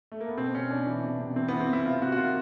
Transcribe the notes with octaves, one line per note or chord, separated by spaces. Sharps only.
A3
A#3
B3
B2 C4
B2 C#4
B2 D4
E3
C3
C3
E3 C4
E3 B3
C4
E3 E4
C3 F4
C3 F#4
F#4
D#3 F4